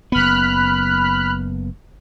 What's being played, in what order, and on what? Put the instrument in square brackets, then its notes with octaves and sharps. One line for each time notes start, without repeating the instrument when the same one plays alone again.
[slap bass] F#1 B3 [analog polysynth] B5 F6 F#6